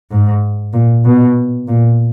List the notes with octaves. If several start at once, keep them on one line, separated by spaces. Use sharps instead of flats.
G#2
A#2
B2
A#2